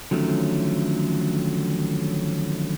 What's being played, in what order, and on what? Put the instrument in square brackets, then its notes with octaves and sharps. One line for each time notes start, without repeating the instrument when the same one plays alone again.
[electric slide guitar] D3 D#3 F3 F#3 A3 C#4